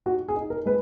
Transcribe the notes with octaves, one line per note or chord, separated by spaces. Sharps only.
D#4 F#4
G#4
D#4
A#4
G#3 B4